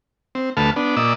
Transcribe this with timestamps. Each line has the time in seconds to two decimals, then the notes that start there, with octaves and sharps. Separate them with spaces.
0.35 C4
0.57 D2 A3 B4 A5 F6
0.76 B3 D4
0.97 A#2 D5 D#5 E6